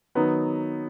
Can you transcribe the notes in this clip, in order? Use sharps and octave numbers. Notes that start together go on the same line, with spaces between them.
D#3 F#3 B3 D#4